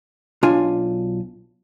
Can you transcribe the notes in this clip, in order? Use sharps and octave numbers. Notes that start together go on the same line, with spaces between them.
B1 D4 F4 G#5